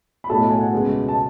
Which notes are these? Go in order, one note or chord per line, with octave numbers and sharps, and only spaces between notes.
B5
B1 A2 F#3 A3 A4 A5
G#5
F#5
C#2 B2 G#3 B3
A5